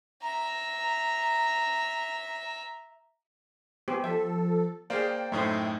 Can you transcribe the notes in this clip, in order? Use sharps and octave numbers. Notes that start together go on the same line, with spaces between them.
E5 A#5
B3 G4 C5 G#5
F3 A4 E5
A#3 G#4 C5 D5 F5 G5
F#2 A2 A3 D#4 C5 E5 G5 G#6